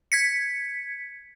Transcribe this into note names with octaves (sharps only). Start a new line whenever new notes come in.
G#6 B6 C#7